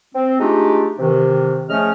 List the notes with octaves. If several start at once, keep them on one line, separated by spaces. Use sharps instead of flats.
C4
G#3 A3 D4 D#4 F4 G4
C3 D#3 E3
C#3 F3 A3 C#4 D#5 F6